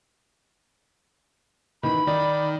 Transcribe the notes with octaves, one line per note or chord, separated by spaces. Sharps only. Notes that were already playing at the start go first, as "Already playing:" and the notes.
D#3 E3 B5
D#3 D#4 D5